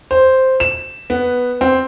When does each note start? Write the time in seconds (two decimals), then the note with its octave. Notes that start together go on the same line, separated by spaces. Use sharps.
0.11 C5
0.60 E7
1.10 B3
1.61 C4